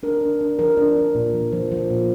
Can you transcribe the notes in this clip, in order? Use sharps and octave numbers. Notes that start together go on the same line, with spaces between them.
D4 A#4
D4
D4
F3 A#4
D4
D4
A#2
F3
F3
F3
A#2